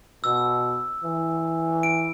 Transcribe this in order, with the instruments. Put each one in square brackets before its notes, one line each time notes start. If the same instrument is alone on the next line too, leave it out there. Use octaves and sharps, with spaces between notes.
[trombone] B2 [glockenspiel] E6
[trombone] E3
[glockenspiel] D7